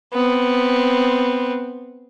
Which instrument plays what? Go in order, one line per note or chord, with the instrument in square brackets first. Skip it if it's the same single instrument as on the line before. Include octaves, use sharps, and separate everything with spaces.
[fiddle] B3 C4